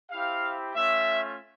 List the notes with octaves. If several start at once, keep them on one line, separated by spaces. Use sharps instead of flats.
C4 E4 G4 F5
A3 C#4 F4 E5